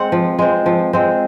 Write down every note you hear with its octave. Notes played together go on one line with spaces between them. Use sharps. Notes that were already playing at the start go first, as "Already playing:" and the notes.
Already playing: G#3 C4 F#5
F3
G#3 C4
F3
G#3 C4